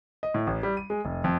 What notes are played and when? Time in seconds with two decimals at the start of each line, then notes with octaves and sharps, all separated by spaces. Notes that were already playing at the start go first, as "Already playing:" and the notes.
0.23 D#5
0.34 A2
0.47 A1
0.63 G3
0.77 D#7
0.90 G#3
1.05 F1
1.24 F2